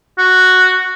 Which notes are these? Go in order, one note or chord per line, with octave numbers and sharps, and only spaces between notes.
F#4